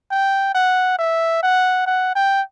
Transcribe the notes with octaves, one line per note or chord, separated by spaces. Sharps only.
G5
F#5
E5
F#5
F#5
G5